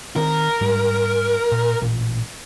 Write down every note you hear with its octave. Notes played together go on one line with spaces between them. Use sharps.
D#3 C4 A#4
G#2 G3
A#2
A1 A#2